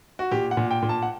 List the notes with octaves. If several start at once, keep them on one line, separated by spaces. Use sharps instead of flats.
F#4
A#2 G4
F#5
A#2
G5
A#2
A5
F#5